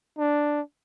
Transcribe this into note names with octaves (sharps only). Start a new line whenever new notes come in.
D4